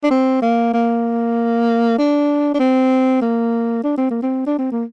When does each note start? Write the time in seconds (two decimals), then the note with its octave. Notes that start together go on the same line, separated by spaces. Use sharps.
0.04 D4
0.11 C4
0.42 A#3
0.74 A#3
1.98 D4
2.54 D4
2.60 C4
3.22 A#3
3.84 D4
3.98 C4
4.11 A#3
4.23 C4
4.47 D4
4.58 C4
4.72 A#3